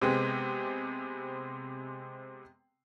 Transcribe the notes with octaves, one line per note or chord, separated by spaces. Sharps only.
C3 G#3 B3 C4 G#4